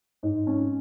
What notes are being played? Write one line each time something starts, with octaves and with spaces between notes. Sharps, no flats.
G#2
C#4